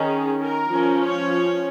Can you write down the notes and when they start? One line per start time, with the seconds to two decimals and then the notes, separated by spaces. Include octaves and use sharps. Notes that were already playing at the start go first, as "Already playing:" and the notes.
Already playing: D#3 C#4 G#4
0.40 A#4
0.70 F3 C#4
1.02 C#5